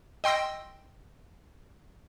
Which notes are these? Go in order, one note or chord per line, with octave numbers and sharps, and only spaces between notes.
D#5 G5 C6 E6 A#6